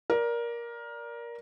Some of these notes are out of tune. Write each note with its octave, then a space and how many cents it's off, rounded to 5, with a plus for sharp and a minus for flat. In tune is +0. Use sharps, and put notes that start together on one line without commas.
A#4 +15 D5 -5